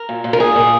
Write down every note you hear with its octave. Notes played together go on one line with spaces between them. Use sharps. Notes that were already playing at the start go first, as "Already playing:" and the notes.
Already playing: A#4
A#2
A#2
A#4
A#2 G#4
A#2